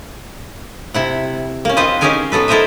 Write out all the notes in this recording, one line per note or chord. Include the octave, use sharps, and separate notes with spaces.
C3 E4 F#5
A#3 C#4
C4 F4 B4 C5 D#5
C#4 D#4 G4 G#4 A#4 G#5
F#3 B3 A4 B4
E4 A4 A#4 C5 D#5 E5